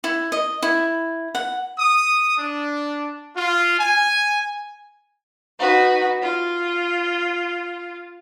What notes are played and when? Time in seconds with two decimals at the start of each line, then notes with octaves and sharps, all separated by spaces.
0.04 E4
0.32 D#5
0.62 E4
1.35 F#5
1.77 D#6
2.38 D4
3.35 F4
3.79 G#5
5.59 D#4 F#4 B4
6.21 F4